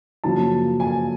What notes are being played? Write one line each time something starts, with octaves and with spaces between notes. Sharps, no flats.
F#2 C#3 F3 A#3 A5
G#5